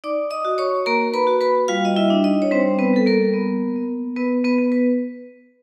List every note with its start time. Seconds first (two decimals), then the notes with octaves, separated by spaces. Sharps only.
0.04 D#4 D5 D6
0.30 D#5 D#6
0.45 F#4
0.58 C#5 C#6
0.86 A#3 A#4 A#5
1.14 B4 B5
1.27 F#4
1.41 B4 B5
1.68 G3 F4 F5
1.85 D#5
1.96 E4 E5
2.10 D4
2.24 D#4 D#5
2.42 C#5
2.51 G3 C4 C5
2.79 B3 B4
2.93 G3 A4
3.06 A#3 A#4
3.33 B3
3.76 B3
4.16 B3 B4
4.44 B3 B4
4.58 B3
4.72 B4